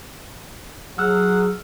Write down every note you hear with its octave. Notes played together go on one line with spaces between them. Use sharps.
F#3 G#4 F#5 E6 F6